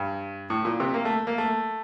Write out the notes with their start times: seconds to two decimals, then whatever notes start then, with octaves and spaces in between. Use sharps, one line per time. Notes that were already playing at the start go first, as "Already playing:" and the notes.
Already playing: G2
0.50 A2
0.65 A#2
0.80 C3
0.94 A#3
1.05 A3
1.27 A#3
1.38 A3